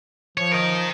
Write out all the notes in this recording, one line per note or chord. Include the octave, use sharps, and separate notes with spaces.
F3 C#5
A#4 D#5